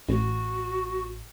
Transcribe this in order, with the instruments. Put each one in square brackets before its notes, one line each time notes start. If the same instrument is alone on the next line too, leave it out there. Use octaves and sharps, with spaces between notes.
[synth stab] A1 [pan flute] F#4